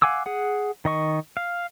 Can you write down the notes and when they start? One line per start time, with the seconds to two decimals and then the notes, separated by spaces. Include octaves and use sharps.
0.02 F5 F#5 G#5 D6 E6
0.26 G#4 F#5
0.85 D#3 D#5 C#6
1.37 F5